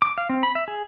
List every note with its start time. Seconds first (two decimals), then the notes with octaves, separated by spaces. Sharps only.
0.02 D6
0.18 F5
0.29 C4
0.43 B5
0.55 E5
0.68 G#4